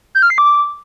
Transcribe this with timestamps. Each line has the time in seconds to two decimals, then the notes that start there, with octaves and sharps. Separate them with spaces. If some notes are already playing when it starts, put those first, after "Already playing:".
0.15 G6
0.22 F6
0.30 C7
0.38 D6